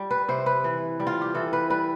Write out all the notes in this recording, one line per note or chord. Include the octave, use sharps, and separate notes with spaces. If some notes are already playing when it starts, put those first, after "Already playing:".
Already playing: G3
B4
C3 C5
B4
E3
G3
F4
G4
E3 A4
B4
G3 B4